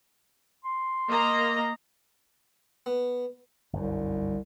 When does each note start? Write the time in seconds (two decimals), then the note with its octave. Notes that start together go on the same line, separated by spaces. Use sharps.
0.65 C6
1.09 A#3 D#5 A#5
2.86 B3
3.73 G1 C2 F#2